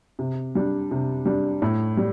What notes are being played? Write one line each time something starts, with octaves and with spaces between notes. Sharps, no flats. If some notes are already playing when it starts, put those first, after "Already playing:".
C3
G3 D4
C3
G3 D4
A2
G3